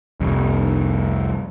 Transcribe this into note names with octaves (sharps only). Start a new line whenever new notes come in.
C2 F2